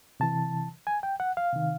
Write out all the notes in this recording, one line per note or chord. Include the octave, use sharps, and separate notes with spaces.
C3 E3 A5
G#5
G5
F#5
F5
C3 D#3